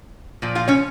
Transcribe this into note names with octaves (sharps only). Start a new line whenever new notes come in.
A#2 F3
F4 F5
C#4 C#5